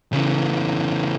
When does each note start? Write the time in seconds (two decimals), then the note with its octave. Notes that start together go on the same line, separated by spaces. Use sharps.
0.13 C#3 E3